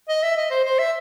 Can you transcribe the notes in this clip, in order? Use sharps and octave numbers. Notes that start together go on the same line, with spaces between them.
D#5
E5
D#5
C5
C5
E5